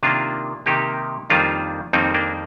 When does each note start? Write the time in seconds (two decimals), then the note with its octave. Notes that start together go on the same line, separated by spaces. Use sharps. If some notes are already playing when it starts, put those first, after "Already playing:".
0.03 C3 D#3 A#3 D4 F4
0.66 C3 D#3 A#3 D#4 G4
1.30 F2 D#3 G3 A#3 D4 F4
1.93 F2 D#3 G3 A#3 C4 D#4
2.14 A#3 D4